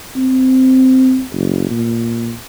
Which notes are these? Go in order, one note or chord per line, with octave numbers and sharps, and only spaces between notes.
C4
F#1
A#2